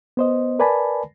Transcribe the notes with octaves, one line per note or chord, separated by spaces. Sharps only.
B3 C5 D#5
A#4 B4 D5 G#5 A5 B5